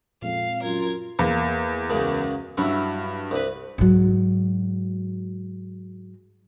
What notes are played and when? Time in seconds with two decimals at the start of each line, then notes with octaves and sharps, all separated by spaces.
0.22 F2 A#2 G#3 C4 F5
0.63 F#2 F4 A#4 G#6
1.19 E2 A#3
1.90 C#2 F#2 C#3
2.58 G2 F#3 E4
3.31 C2 B4
3.78 G#2 F#3